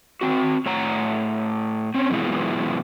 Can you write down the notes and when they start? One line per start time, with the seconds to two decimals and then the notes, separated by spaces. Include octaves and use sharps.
0.21 C4 F#4
0.66 A2 C#5 F#5 A#5
1.94 C4 C#4
2.10 F#2 B2 E3 G#3 E4 F4